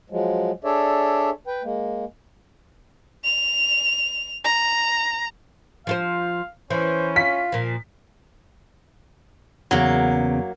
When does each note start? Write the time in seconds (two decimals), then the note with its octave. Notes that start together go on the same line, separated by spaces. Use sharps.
0.10 F3 F#3 G#3
0.64 D4 G#4 A4 C#5 D5 E5
1.47 B4 G5
1.64 G#3 A#3
3.24 F7
4.44 A#5
5.87 F3 F4 C5 F5
6.70 E3 C#4 C5
7.16 F4 B6
7.52 A#2 F3
9.71 E2 C#3 F#3 A#3 B3